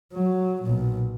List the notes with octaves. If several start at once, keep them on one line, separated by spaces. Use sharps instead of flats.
F#3
B1 A#2